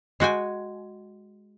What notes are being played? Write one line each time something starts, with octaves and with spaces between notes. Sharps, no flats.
G#3 F#4 G5 G#5